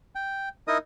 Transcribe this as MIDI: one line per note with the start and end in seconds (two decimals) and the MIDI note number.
0.15 0.49 79
0.68 0.78 63
0.68 0.78 64
0.68 0.78 70
0.68 0.78 75
0.68 0.78 87